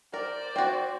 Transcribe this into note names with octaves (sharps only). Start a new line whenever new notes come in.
A#4 C5 D5
C4 F#4